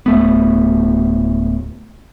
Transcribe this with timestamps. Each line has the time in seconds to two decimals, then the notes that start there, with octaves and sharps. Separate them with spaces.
0.06 D1 A3 B3